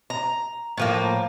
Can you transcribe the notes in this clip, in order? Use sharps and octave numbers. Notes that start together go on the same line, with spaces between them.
A#5
A2 F3 A#3